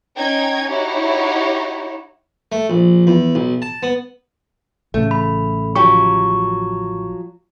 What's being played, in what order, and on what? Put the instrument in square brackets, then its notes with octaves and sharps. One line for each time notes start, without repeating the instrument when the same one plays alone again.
[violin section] C#4 D#4 G5 G#6
D#4 E4 F#4 G4 C#5
[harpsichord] A3
A#1
E2
B1
A5
B3
[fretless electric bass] A1 C#3 [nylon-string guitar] A3
[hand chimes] B5
[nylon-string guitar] F3 F#3 G4 [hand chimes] C#6